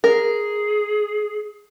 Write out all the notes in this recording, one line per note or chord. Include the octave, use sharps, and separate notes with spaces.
G#4 A#4